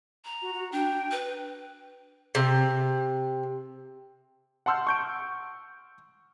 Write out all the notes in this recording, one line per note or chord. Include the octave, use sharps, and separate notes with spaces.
A#5
F#4
F#4
D4 G5
B4
C3
F#5 A5 C6 E6 F6 G6
C#6 G6 D7